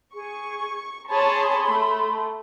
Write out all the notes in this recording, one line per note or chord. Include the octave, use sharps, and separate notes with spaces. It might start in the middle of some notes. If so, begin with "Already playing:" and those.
G#4 C#6
G#4 C#5 A5 B5 C6
A3